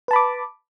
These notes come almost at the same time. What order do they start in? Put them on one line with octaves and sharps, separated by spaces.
B4 A5 B5 D6